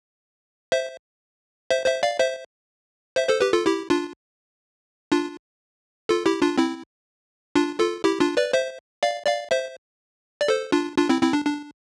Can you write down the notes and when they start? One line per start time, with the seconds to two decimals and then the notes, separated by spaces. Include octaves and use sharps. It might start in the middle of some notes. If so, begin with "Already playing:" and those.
0.72 C5 E5
1.70 C5 E5
1.86 C5 E5
2.03 D5 F5
2.19 C5 E5
3.16 C5 E5
3.29 A4 C5
3.40 G4 B4
3.53 F4 A4
3.66 E4 G4
3.90 D4 F4
5.12 D4 F4
6.09 F4 A4
6.26 E4 G4
6.42 D4 F4
6.58 C4 E4
7.55 D4 F4
7.80 F4 A4
8.04 E4 G4
8.20 D4 F4
8.37 B4 D5
8.53 C5 E5
9.03 D5 F5
9.27 D5 F5
9.51 C5 E5
10.41 D5
10.48 A4 C5
10.72 D4 F4
10.97 D4 F4
11.09 C4 E4
11.22 C4 E4
11.33 D4
11.46 D4